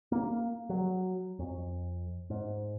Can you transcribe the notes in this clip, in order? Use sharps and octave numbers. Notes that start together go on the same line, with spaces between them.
A#3
F#3
F2
G#2